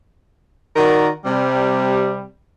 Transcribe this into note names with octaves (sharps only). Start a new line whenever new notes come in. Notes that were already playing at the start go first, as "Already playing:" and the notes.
D#3 F#4 A#4 D5
C3 G3